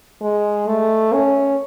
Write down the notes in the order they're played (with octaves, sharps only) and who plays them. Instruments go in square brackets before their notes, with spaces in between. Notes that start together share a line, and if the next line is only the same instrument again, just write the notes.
[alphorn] G#3
A3
C#4